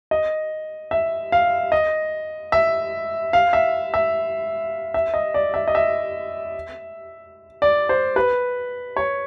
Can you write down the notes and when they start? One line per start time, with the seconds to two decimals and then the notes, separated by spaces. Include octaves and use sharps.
0.11 D#5
0.91 E5
1.32 F5
1.72 D#5
2.52 E5
3.33 F5
3.53 E5
3.94 E5
4.94 E5
5.14 D#5
5.34 D5
5.54 E5
5.68 D#5
5.75 E5
7.62 D5
7.89 C5
8.16 B4
8.96 C#5